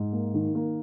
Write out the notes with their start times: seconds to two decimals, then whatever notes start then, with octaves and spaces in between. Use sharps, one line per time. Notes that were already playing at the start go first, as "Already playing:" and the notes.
Already playing: G#2
0.13 A#3
0.34 D#3
0.55 A#3